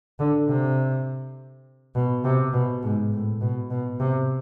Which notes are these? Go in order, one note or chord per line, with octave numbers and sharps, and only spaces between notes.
D3
C3
B2
C3
B2
G#2
A2
B2
B2
C3